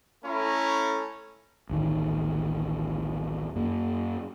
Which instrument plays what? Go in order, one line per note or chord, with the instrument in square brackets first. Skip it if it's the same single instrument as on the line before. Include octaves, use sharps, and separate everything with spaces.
[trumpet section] A3 C#4 E4 A4 A#5
[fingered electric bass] A1 D2 D#3
F#2 A#3